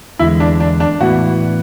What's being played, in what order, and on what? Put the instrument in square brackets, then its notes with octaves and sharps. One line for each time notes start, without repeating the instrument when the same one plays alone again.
[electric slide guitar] E2 D3 G#3 [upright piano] E4
[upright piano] D4
D4
D4
[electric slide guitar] A2 E3 B3 E4 [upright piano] F#4